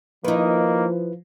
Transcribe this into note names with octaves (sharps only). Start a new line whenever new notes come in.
D#3 F3 A#3 D#4 E4 B4